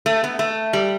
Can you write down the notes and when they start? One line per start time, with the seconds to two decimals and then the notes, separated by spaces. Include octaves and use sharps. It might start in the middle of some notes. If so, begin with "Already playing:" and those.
0.06 A3
0.24 B3
0.39 A3
0.73 G3